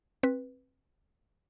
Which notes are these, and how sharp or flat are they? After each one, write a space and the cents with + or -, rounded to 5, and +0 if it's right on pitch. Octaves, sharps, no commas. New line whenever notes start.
C4 +20 B4 +0